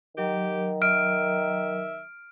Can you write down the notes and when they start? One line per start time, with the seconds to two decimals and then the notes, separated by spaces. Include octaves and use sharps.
0.17 D#3 F#3 G4 A#4
0.82 E5 F6 D7